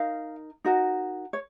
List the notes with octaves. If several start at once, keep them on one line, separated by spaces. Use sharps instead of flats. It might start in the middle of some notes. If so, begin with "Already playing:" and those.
Already playing: D#4 A#4 F5
D#4 F#4 A#4
C#5